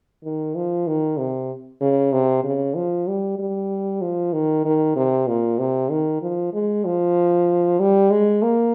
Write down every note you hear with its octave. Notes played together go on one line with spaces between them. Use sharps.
D#3
F3
D#3
C3
C#3
C3
C#3
F3
G3
G3
F3
D#3
D#3
C3
A#2
C3
D#3
F3
G#3
F3
G3
G#3
A#3